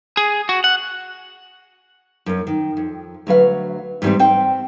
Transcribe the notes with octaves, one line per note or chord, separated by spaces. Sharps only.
G#4
F#4
F#5
F#2 C#4
D#3
F2
D2 F#3 B4 F5
G#2 E3 F#3 G3 C4
C4 G5